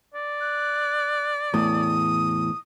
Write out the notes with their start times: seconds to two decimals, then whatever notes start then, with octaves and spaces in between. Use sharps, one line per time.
0.14 D5
0.41 F#6
1.54 E2 A2 D#6